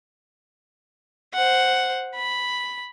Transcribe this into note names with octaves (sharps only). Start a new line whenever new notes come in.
C5 F#5
B5